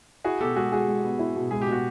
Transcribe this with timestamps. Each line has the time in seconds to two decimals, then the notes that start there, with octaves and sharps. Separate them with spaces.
0.24 E4 F#4 G#4
0.40 B2 G4 A4
0.56 G#3 F#4 G#4
0.72 G#3 F#4 G#4
0.88 G#3
1.04 B3
1.19 E4
1.36 B2
1.51 G#3 G#4
1.62 G4
1.67 B2
1.72 F#4